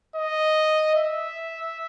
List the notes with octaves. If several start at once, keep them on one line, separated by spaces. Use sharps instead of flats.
D#5
E5